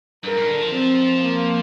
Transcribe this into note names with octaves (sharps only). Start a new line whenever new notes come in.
G2 A#4
A#2
D3
F3
C4
A#3